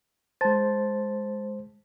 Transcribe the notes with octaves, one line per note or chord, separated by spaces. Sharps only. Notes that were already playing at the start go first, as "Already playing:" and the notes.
G#3 C5 A5 A6